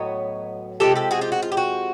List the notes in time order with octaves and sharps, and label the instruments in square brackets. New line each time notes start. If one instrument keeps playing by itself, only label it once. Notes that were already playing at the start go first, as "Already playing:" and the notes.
Already playing: [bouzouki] A2 F#3 B3 C#5 D#5
C3 F3 G#3 G4 A4
G4 A4
F#4 G#4
F4 G4
F#4
F4
G4
F#4